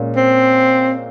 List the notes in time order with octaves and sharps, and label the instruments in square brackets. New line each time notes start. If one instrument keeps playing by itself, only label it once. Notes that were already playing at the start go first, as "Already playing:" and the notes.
Already playing: [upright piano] A#2 G#3 C#4
[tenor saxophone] C4